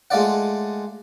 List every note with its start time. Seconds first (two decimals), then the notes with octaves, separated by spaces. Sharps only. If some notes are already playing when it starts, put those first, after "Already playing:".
0.11 G#3 A3 F4 D5 F#5